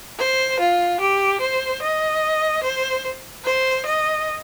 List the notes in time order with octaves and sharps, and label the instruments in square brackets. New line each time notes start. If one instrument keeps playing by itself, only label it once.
[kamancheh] C5
F4
G4
C5
D#5
C5
C5
D#5